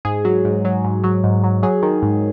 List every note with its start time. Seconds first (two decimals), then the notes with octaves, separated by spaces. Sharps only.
0.05 G#2 G#4
0.25 F#3
0.45 G#2
0.65 F#3
0.84 G#2
1.04 F#3
1.24 G#2
1.44 F#3
1.63 F#3 G#4
1.82 D#3
2.02 G#2